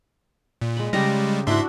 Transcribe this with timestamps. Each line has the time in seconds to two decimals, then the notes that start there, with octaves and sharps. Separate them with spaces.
0.62 A#2
0.77 G#3 B5
0.93 C#3 G3 G#3 G4 A#5
1.47 G#2 D4 E4 F#4 E5 C6